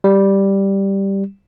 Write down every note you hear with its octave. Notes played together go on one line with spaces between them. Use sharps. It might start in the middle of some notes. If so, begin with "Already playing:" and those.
G3